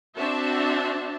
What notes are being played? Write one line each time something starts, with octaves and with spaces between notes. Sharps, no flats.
C4 D4 F#4 E5 A5